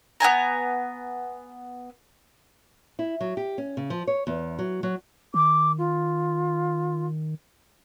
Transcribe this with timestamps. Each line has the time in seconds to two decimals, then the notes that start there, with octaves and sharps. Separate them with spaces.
0.20 B3 D#4 G#5 A#5
2.99 E4
3.21 F#3
3.37 G4
3.58 C#4
3.77 C#3
3.90 F3
4.07 C#5
4.27 E2
4.59 F#3
4.83 F#3
5.34 D#3 D6
5.78 F4